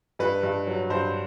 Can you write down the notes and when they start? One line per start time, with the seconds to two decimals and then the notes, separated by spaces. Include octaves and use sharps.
0.19 G2 B4
0.43 G2
0.67 F#3
0.90 G2 C5